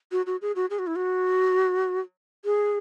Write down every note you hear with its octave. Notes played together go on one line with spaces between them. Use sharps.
F#4
F#4
G#4
F#4
G#4
F#4
E4
F#4
G#4